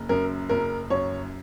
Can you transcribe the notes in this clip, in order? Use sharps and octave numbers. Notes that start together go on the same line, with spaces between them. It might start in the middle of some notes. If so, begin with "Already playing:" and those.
Already playing: F#1
F#2 A#4
F#1 A#4
F#2 C#5